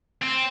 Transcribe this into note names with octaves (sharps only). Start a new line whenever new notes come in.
C4